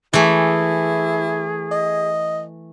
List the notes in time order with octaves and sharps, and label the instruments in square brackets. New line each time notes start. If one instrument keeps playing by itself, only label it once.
[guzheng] E3 A3 [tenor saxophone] E4 [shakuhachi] G#4
[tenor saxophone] D#5